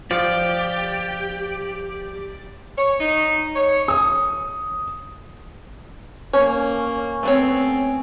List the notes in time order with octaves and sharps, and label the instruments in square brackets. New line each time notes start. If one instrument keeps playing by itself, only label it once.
[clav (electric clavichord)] F3 [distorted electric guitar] G4 [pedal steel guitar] D5
[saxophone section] C#5
D#4
C#5
[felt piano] D#6
[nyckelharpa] A#3 [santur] C#4 [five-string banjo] C#5
[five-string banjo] A3 B3 C#5 [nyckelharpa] C4